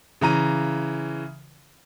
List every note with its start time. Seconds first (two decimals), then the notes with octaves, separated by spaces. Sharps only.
0.21 C#3 E3 A#5 D#7